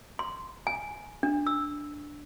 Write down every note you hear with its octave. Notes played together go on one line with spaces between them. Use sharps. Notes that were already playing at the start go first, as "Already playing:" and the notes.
C6
G#5
D4
E6